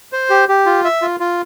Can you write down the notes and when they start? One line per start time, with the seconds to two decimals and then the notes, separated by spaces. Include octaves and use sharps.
0.12 C5
0.30 G4
0.48 G4
0.66 F4
0.85 E5
1.02 F4
1.20 F4